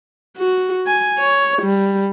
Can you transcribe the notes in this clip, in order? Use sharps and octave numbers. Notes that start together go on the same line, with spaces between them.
F#4
G#5
C#5
G3